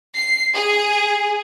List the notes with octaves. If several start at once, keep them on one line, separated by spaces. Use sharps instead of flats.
C7
G#4